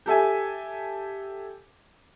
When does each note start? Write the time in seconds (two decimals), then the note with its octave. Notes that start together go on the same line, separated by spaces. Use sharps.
0.06 G4 A4 E5 G#5